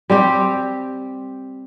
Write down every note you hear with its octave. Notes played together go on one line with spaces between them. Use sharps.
G3 C4 G4